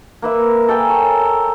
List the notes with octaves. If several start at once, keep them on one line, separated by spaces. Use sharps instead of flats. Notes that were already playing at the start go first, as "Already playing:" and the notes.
A#3 B4 E5
A4 A#4 G5 G#5
C#5